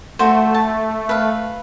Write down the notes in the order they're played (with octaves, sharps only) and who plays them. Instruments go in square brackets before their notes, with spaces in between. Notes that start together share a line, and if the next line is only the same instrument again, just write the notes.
[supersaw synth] A3 [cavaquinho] F#4 C5
[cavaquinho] A5
B4 F5